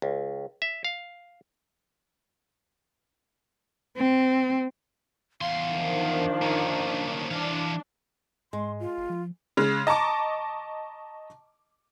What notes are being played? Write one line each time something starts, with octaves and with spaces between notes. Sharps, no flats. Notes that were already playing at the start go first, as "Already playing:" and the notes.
C#2
E5
F5
C4
E2 F5 C6
D#3 F3 D4
A#3 C#4
E3 D4 F5
G#2 G#3 C6
F4
G1
F3
C#3 G#3
D#5 A5 A#5 C#6 D6